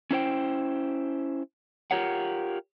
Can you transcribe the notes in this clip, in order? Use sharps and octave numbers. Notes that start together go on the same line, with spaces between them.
C#4 E4 C5 G5
F4 G4 A#4 C#5 F#5